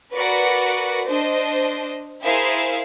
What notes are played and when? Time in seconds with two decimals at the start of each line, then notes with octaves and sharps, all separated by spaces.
0.13 F#4 A#4 B4 D5 F#5
1.07 D4 C5 D#5
2.24 E4 G#4 A#4 C5 E5 F5